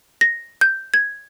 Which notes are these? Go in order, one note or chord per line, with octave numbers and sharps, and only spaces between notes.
A#6
G6
G#6